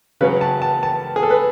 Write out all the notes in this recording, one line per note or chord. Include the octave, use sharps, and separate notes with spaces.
C#3 F#3 C#4 B4
A5
A5
A5
G#4
A4
B4